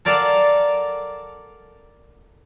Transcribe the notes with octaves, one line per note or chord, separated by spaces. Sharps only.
A4 A#4 D5 F5 F#5 A5